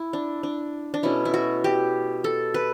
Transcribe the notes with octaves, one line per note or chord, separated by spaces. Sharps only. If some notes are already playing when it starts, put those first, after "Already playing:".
Already playing: E4
D4
D4
D4
B2 A3 C#4 E4
E4
F#4
G4
A4
B4